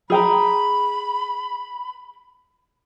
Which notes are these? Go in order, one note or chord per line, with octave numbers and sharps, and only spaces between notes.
G#4 G5 A#5 B5